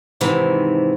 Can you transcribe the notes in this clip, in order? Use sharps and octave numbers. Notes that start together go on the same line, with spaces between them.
G#2 C3 D#3 E3